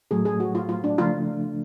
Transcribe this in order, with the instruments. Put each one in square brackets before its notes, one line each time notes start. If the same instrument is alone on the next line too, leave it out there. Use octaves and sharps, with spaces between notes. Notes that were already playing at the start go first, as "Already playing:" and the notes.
[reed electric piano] A2 F#3 A3 [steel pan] G#4
[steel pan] G#4
F#4
F4
F4
D4
[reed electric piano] C#3 F3 A3 D4 [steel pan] F4